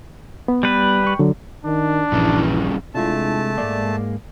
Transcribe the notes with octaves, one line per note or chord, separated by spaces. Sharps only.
B3
G3 B4
G5 C#6
D3 F#3
D#3 D4
A#1 G2 C#3 E3
C3 G#3 A3 D4 E4 F4 A5
G#2 G#3 A#3 D5